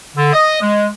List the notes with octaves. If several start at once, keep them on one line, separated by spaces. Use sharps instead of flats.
D3
D#5
G#3